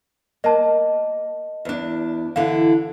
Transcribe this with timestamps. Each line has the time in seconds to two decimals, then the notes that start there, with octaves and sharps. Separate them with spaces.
0.44 A#3 D#5 A5
1.65 E2 D4
2.36 D3 E3 F5